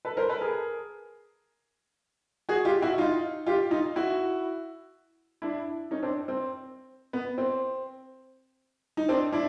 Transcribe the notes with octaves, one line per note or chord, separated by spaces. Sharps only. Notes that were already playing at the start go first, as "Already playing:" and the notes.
A4 B4
A#4 C5
A4 B4
G#4 A#4
F#4 G#4
F4 G4
E4 F#4
D#4 F4
F4 G4
D#4 F4
E4 F#4
D4 E4
C#4 D#4
C4 D4
C4
B3
C4
D#4
C4 D4
D4 E4